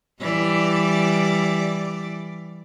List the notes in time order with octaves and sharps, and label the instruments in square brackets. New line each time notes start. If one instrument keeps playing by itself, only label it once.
[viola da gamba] E3 G3 D5